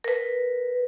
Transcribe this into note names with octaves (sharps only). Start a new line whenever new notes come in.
A#4 B4